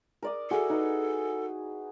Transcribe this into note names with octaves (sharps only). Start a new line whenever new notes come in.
A#4 D5 D#6
E4 F#4 G#4 A4
D#4 B4